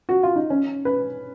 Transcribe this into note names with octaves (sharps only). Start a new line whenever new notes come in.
F#4
F4
D#4
C#4
B4